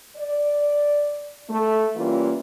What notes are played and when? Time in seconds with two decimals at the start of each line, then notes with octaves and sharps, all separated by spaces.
0.17 D5
1.50 A3
1.96 E3 G3 A#3 C#4 E4 F4